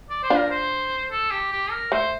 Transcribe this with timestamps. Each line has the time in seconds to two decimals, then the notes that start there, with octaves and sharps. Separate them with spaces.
0.10 D5
0.23 C5
0.30 D4 F4
0.37 A#4
0.51 C5
1.11 A4
1.31 G4
1.52 G4
1.71 A#4
1.92 A3 C5